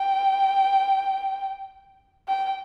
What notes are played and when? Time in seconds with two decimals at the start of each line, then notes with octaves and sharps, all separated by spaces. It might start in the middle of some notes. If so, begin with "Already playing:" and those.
Already playing: G5
2.28 G5